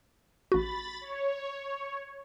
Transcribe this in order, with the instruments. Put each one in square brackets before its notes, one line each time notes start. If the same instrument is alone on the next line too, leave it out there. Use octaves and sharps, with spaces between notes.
[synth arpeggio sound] A1 F#4 [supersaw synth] B5 A6
[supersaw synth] C#5